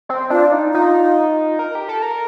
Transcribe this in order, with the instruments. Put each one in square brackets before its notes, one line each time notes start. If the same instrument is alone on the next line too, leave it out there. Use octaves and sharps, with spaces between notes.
[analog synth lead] C4
[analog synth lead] D4 [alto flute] F4
[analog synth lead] D#4
[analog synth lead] D#4 [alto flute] F4
[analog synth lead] A#4
G4
A4
A#4